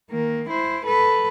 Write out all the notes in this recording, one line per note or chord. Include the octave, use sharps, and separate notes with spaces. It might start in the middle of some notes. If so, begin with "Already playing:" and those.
D#3 A#3
E4 C5
A4 B4